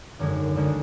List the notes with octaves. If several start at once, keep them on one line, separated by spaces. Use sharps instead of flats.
G#1 F#2 D3 G#3
D2 D3 G#3